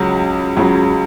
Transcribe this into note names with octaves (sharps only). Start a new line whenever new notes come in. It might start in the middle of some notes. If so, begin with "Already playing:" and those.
Already playing: C#2 C#3 F#3
C#2 C#3 F#3